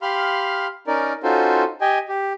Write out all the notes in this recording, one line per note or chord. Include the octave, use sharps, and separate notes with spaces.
G4 F5 B5 C6 F6
C#4 D#4 A#4 D5
C#4 D#4 F4 F#4 A4 C5
G4 D#5 G5 G#5
G4